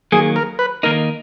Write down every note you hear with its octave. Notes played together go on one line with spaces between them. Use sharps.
D#3 F#3 A#3 G#4
A#4
B4
D#3 A#3 D#4 A#4